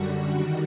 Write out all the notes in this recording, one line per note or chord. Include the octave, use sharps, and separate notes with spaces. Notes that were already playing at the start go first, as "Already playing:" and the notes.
Already playing: F#2 D3 G3 F#4
D#3 G3